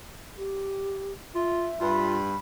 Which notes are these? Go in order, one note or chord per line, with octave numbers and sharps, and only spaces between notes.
G4
F4 E5
G2 F4 B5